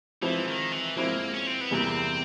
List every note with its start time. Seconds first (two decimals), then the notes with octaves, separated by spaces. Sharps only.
0.22 E3 F3 G#3 C4 E4
0.48 D#3
0.72 E3
0.96 F3 G#3 A#3 C4 E4
1.34 C#4
1.47 C4
1.61 B3
1.71 E2 C3 E3 G3 A#3 C4